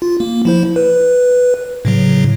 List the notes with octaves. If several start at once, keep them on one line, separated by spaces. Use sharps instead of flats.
F4
A#3
F3 E4 C5
B4
A2 C#3 F#3